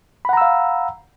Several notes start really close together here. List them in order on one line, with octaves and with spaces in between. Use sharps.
B5 F#5 A#5 E6 F5